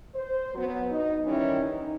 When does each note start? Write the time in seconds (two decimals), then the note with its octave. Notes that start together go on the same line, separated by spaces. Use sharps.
0.15 C5
0.54 F#3 B3
0.91 D#4
1.25 D#3 E3 G3 C#4 E4
1.61 D#4